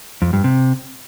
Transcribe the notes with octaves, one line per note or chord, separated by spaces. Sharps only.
F2
G2
C3